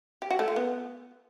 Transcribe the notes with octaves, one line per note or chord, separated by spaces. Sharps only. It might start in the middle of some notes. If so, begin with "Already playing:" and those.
G4
F#4
A3
F4
B3